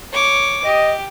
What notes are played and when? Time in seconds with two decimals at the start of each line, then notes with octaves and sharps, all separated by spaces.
0.13 C#5 D6
0.64 G4 D#5